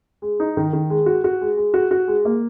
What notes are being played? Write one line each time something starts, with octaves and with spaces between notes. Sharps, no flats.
G#3
D#4
D#3
D#3
G#3
F#4
F#4
G#3
G#3
F#4
F#4
G#3
A#3